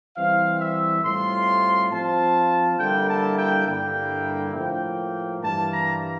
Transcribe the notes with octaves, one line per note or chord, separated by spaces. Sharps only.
E3 G3 C4 F5
E5
A2 G3 C4 F4 C6
F3 C4 F4 A5
D3 G3 A#3 E4 G5
A5
G5
G2 D3 G3 A#3 E4 G5
A2 F3 A#3 G5
G2 E3 G3 A#3 A5
A#5